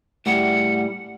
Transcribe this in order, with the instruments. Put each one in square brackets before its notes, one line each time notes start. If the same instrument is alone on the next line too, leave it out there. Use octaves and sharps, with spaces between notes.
[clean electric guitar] A2 G3 [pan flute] F#5